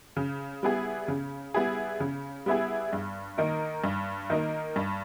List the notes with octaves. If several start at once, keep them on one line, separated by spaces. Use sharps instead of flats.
C#3
G3 B3 E4 G#4
C#3
G3 B3 E4 G#4
C#3
G3 B3 E4 G#4
G2
D#3 A#3 D#4 A#4
G2
D#3 A#3 D#4 A#4
G2